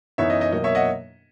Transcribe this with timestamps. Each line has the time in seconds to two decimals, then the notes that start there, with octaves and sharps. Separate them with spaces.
0.18 F#2 E3 B3 D#4 C#5 E5
0.30 D#5
0.41 D#5
0.52 B2 F#3 A#3 D#5
0.64 C#5 E5
0.75 D#5 F#5